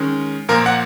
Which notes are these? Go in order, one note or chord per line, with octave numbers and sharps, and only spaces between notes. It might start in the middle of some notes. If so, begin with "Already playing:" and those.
Already playing: D#3 G#3 C#4
A#2 F3 A#3 A#4
F#5